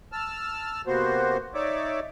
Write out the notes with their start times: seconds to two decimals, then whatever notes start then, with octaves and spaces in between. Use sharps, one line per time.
0.12 A5 E6 F6
0.87 C3 A#3 B3 F#4 C5
1.55 D#4 C#5 D5 E5 D6